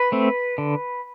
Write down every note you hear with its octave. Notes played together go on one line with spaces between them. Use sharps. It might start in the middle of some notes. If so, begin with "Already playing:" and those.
Already playing: B4
A3 C4
D3